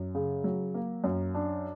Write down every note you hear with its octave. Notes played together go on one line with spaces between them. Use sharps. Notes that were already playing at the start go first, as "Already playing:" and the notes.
Already playing: F#2
C#3
F#3
A#3
F#2
D4